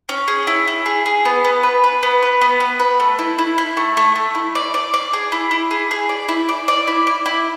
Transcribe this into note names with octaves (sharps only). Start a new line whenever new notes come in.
C#4
G#4
E4
E4
G#4
G#4
B3
B3
B4
B4
B3
B4
B3
B3
B4
A3
E4
E4
E4
A3
A3
A3
E4
D5
D5
D5
G#4
E4
E4
G#4
G#4
D5
E4
D5
D5
E4
D5
E4